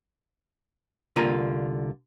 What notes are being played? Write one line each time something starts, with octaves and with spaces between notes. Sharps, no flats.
C2 D3 A#3 F4 G#5 A#5